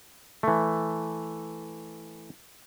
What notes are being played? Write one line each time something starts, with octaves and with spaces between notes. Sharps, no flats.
E3 A3